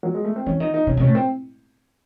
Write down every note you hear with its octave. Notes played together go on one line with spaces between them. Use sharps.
F#3
G#3
A3
C4
E3 C#4
D#3 D#4
D#4
C3 C#4
C3 C#4
A2
C4